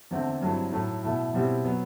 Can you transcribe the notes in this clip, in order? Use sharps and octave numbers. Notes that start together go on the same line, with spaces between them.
E2 D3 A3 C4
G2 F#3 A3 C4 E4
A2 F#3 A3 E4
B2 A3 E4
B2 G3 C4 E4
F#3 B3